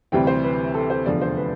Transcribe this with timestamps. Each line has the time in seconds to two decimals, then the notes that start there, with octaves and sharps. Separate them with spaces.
0.12 D2 C3 E3 G3 C4 G5
0.27 C5
0.44 B4
0.74 A4
0.90 C5
1.06 F1 E2 D3 F3 D5
1.21 C5
1.37 B4